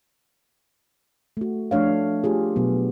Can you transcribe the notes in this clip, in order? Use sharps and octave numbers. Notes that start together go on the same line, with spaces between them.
A3 F#4
F3 A3 D4 C#5 F5
A3 F4 G4 G#4
B2 F#3 B3